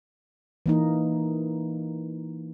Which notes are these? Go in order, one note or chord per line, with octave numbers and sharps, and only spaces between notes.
E3 A#3 D#4